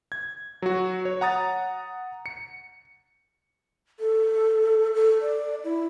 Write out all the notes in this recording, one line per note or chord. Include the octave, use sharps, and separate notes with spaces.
G#6
F#3 F#4
C#5
F#5 A#5 D#6 A6
C#7
A4
A4
D5
E4